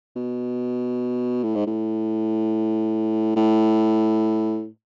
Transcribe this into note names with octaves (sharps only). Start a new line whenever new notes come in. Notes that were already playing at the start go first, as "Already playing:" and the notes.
B2
A2
G#2
A2
A2